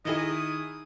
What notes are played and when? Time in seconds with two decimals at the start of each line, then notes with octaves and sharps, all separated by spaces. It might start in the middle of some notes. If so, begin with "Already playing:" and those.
0.05 D#3 E4 G#4 D#5
0.18 D#6